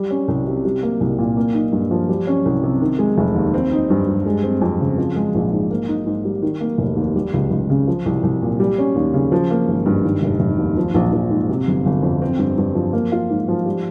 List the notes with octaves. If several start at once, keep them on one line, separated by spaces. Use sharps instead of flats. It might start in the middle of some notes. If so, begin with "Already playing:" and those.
Already playing: G3
C#4
C2
C3
G3
A#3
C2
A#2
A#3
D#4
G2
F3
G3
C#4
C2
C3
D#3
G#3
F1
D#2
C4
D#4
G2
G3
G#3
C4
F2
C#3
F3
G#3
A#1
G#2
A#3
D#4
G#2
G3
D#3
A#3
F1
D#2
G3
C#2
C#2
C#3
F3
C2
C2
A#2
G3
C#4
D#2
C#3
F3
A#3
G#1
G2
D#3
F1
F1
D#2
F3
A#1
A#1
G#2
C3
G1
G1
F2
C4
G2
G2
F3
A#3
F4
G#2
F3
G3